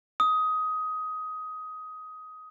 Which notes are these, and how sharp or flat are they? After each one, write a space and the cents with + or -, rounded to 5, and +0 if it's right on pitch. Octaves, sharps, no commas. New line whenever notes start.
D#6 +15